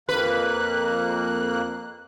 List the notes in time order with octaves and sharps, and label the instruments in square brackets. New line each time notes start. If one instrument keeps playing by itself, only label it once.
[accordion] F2 A#3 F#6 [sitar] B4